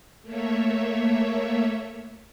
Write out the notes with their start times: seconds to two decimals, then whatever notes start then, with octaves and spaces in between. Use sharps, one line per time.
0.22 A3 A#3 C#5 E5